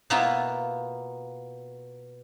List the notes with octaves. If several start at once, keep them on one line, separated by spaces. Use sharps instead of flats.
B2 A#3 B3 E4 F4